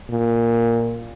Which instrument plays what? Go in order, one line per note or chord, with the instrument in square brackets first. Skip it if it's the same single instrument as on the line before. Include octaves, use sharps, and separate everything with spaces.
[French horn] A#2